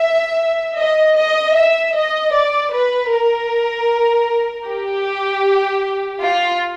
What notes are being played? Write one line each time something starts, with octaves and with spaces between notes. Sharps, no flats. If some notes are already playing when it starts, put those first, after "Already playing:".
Already playing: E5
D#5
D#5
E5
D#5
D5
B4
A#4
G4
F4